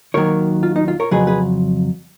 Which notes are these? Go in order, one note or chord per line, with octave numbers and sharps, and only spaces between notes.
D#2 D#3 F#3 A#4 C#5
F4
D#4
F4
A#4 C#5
F2 C#3 F#3 G#4 B4
G#4 B4